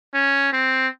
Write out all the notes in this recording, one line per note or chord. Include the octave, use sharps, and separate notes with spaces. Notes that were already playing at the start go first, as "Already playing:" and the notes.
C#4
C4